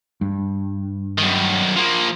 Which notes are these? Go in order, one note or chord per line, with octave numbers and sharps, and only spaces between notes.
G2
F#2 D#3
F3 A#3